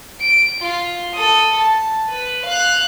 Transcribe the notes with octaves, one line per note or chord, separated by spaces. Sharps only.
D7
F4
A4 D#6
A5
B4
F5 F#6